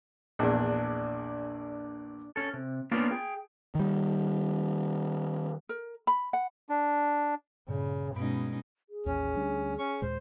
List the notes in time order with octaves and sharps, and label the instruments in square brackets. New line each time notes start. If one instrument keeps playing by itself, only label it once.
[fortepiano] A#1 E2 [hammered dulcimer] D4
[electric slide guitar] C#4 A4
C3
A#3 B3 C#4 D4 F4 A#4
G#4 G5
[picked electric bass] D#3 G3
[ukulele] A#4
B5
F#5
[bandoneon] D4
[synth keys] G2 A#2 [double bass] C#3
[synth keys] G2 B5 D7 [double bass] B2 [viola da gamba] G#3 C#4 D#4
[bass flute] G#4
[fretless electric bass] A1 D#2 [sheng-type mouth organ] C#4
[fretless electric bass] D2 G3 D4
[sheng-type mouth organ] C#4 C#6
[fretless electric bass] D#2 A#2 G#3 [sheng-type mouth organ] C5